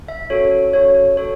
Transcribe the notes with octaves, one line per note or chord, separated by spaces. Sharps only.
E5
C#4 F#4 A4 C#5
C#4 F#4 A4 C#5
F#4 A4 C#5